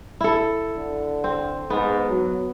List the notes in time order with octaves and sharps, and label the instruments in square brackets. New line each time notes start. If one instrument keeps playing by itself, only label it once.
[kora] E4 A4
[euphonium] D3
[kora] C4
[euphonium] G#2 [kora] B3
[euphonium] F#3